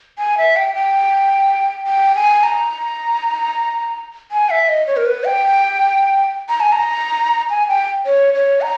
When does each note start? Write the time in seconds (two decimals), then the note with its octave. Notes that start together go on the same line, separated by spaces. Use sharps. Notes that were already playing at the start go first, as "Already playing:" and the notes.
0.19 G#5
0.38 E5
0.56 G5
0.75 G5
1.87 G5
2.16 G#5
2.43 A#5
4.31 G#5
4.50 E5
4.68 D#5
4.87 C#5
4.97 A#4
5.06 B4
5.24 G5
6.49 A#5
6.60 G#5
6.72 A#5
7.50 G#5
7.68 G5
8.06 C#5
8.34 C#5
8.61 A#5